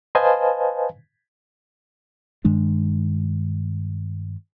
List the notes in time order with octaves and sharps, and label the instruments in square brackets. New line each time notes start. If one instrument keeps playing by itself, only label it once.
[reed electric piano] B4 C5 D#5 F5 G#5 A5
[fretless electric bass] G2 D#3 G#3 D4